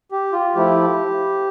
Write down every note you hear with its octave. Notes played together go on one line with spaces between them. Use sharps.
G4
F4
F3 A3 E4 G4